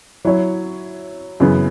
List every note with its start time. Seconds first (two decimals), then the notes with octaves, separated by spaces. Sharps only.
0.25 F#3 E4 C#5
1.40 F#2 C#3 E3 B3